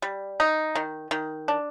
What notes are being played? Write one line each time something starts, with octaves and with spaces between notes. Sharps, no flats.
G3
D#4
D#3
D#3
D4